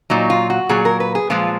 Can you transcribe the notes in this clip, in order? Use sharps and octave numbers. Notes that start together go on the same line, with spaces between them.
A#2 F#3 D#4
F4
F#4
A#2 F#3 G#4
A#4
B4
G#4
A#2 F3 G#3 F4